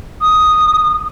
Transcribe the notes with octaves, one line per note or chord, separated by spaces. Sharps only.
D#6